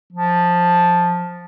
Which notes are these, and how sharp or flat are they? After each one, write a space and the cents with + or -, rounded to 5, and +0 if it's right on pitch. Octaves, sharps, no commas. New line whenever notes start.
F3 +10